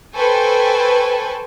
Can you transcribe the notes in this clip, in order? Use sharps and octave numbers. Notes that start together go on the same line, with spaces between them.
A4 B4 C5 G5 G#5 C#6